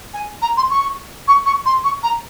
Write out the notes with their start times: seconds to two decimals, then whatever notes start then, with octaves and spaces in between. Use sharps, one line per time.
0.13 G#5
0.42 A#5
0.57 C6
0.70 C#6
1.28 C#6
1.46 C#6
1.65 C6
1.84 C#6
2.03 A#5